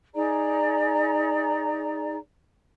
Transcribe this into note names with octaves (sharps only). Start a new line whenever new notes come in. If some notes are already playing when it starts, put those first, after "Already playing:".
D#4 G#4 D5 A#5